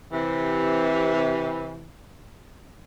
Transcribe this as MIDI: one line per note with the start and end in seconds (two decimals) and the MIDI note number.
0.13 1.87 48
0.13 1.87 52